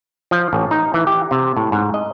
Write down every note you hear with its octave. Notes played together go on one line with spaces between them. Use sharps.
F3
A1
D#4
E3
G4
C3
A2
G#2
D#5